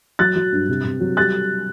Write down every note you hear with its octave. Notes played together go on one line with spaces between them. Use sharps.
F#3 F#6 A6
F#3
G2
C3
C3
F#3
G3 F#6 A6